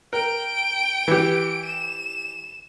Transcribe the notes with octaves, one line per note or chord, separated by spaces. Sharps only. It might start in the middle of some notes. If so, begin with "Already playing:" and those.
A#4 G5 D7
E3 G4
E7